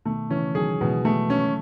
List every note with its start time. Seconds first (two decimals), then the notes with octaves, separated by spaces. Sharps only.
0.05 B2 D#3 A3
0.30 C#3 E3 C#4
0.55 D#3 F#3 G#4
0.80 B2 E3 G#3
1.05 A3
1.30 C#4